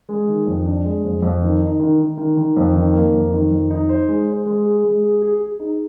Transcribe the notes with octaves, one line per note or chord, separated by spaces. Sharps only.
G#3
D#3
F2
D4
G#3
F2
F2
D#3
D#4
D#3
D#3
D#3
D#3
F2
D#3
A#3
F2
D#3
F2
D#4
C5
G#3
C5
G#3
G#4
G#3
G#4
G#4
G#4
D#4